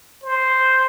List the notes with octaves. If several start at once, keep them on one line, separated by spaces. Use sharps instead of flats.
C5